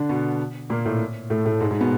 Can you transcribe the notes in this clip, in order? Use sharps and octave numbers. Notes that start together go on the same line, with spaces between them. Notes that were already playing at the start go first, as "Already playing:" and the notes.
Already playing: D3 D4
B2 B3
A#2 A#3
A2 A3
A2 A3
A2 A3
G#2 G#3
G#2 G#3
B2 B3